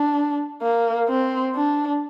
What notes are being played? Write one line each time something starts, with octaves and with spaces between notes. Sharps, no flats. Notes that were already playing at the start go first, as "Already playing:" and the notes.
Already playing: D4
A#3
C4
D4